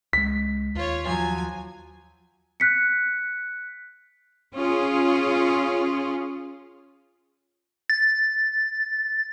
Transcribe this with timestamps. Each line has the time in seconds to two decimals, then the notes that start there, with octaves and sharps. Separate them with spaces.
0.13 C#2 G#3 B6
0.75 D#2 F4 C#5
1.06 F3 F#3 G#5
2.60 F#6 B6 C#7
4.55 C#4 F4 G#4
7.90 A6